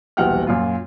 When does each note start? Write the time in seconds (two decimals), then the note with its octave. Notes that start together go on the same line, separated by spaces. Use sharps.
0.17 D#1 B1 E3 F#5 G5 F6
0.47 F#2 A#2 F4